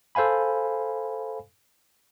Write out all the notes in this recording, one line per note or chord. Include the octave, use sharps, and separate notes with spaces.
A4 C5 F5 G#5 B5